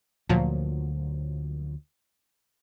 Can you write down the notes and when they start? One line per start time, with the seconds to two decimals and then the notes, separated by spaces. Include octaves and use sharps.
0.29 D2 A#2 F3 F#3